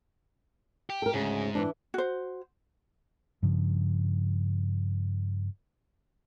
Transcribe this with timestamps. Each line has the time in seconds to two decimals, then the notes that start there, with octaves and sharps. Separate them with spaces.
0.90 G4
1.02 A4 A#4
1.14 D2 G#2 C#3 G#4
1.55 E3 D4
1.94 F#4 C5
3.43 G2 C#3 F3